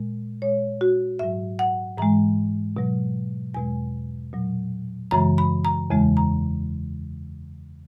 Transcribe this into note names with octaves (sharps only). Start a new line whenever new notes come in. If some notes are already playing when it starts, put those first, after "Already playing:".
Already playing: A#2 G#3
A#2 G#3 C#5
F#4
G#2 F#3 E5
F#5
G#2 E3 G#3 A#5
B2 F#3
E2 B2 G#3 G#5
A#2 F#3
F#2 C#3 E3 G#3 A#5
B5
A#5
E2 C#3 E3 G#3
A#5